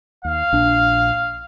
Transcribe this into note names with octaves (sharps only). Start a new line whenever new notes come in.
D#2 F5
A#1 D4